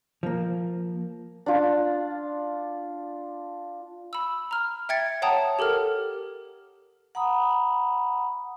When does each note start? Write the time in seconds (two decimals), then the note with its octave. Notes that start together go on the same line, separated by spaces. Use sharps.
0.23 F3 A#3
1.46 D4 F4
4.13 B5 E6
4.51 A#5 F6
4.89 E5 G5 G#6 A6 C#7
5.22 C#5 F#5 G5 A5 A#5 D#6
5.59 G4 A4 A#4 F6
7.15 F#5 A#5 B5 D#6